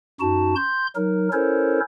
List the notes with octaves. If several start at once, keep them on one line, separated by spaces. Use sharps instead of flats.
F#2 D#4 F#4 A5
C6 G6
F#3 D#4 A#4
C#4 E4 A4 A#4 C5 C#5